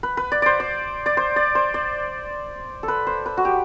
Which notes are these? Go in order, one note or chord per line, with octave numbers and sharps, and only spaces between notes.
B4
B4
D5
C5 D5
D5
D5
C5
D5
C5
D5
A4
B4
C5
B4
F#4
G4